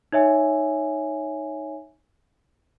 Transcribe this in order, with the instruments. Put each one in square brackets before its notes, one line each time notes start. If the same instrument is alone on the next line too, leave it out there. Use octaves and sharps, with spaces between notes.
[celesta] D#4 C#5 E5 G#5